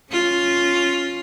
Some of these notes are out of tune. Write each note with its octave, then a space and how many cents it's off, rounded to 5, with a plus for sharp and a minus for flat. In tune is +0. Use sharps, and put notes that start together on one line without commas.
C#4 +0 F4 +0